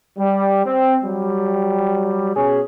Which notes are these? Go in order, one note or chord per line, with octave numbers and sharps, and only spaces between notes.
G3
C4
F#3 G3
B2 C#4 G#4